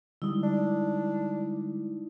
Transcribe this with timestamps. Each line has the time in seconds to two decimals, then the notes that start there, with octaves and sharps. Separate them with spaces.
0.22 D3 G3 G#3 D#4 E4
0.43 D4